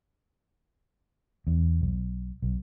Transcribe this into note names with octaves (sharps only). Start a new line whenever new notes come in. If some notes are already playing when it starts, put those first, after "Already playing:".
E2
B1
B1